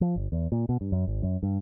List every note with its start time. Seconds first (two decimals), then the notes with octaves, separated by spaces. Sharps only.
0.01 F3
0.16 G1
0.32 E2
0.52 A#2
0.69 B2
0.81 G2
0.92 F#2
1.07 G#1
1.22 F#2
1.43 G2